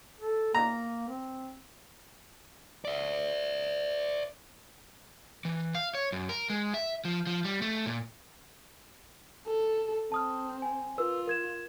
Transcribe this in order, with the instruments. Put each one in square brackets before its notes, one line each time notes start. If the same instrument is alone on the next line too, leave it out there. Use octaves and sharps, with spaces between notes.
[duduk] A4
[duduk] A#3 [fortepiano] A#5
[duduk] C4
[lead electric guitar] D5 E5
[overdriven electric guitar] E3
F5
C#5
F#2
A#4
G#3
E5
F3
F3
G3
A3
A#2
[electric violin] A4
[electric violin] C4 [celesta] A5 D#6 F6
[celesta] G#5
[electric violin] F4 [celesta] A#4 B4 E6
[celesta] A#4 G#6 E7